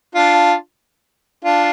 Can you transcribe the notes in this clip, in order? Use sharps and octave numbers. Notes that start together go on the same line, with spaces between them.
D4 F4
D4 F4